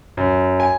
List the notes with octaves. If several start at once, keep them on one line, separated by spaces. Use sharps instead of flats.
F#2
G#5